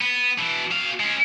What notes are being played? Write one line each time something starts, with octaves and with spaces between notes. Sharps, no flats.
B3
B2 E3
B2 F5
G#3 C#4